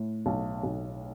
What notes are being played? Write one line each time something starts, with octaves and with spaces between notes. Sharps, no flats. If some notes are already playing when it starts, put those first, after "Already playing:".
Already playing: A2
B1
B1